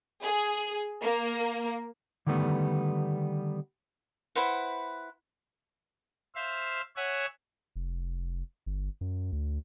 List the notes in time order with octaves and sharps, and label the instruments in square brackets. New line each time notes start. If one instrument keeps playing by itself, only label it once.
[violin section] G#4
A#3
[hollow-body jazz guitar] D3 D#3 G3 A3 B3
[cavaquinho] E4 B4 C5 F#5
[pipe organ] C5 E5 F5
C#5 E5 F#5 G#5
[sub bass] F1
G1
F#2
D2